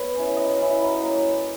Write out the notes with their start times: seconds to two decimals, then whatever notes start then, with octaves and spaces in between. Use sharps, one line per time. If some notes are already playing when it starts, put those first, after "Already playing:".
Already playing: B3 C#5
0.15 C#4 E4
0.36 F#3 D#5
0.59 C#4 E4
0.82 F#3
1.03 A#3